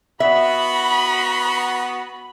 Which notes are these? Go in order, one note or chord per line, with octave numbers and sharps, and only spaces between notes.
B3 F#4 E5 B5